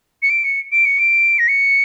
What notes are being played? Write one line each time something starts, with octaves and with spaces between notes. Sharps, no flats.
C#7
D7
C#7
D7
C#7
D7
A#6
C#7